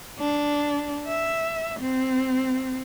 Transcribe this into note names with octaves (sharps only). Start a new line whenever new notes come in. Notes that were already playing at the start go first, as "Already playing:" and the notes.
D4
E5
C4